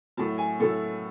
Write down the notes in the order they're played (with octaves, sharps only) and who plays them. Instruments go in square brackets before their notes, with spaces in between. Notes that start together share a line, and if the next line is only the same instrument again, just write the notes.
[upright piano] A2 F#3 A5
G#5
A2 F#3 A4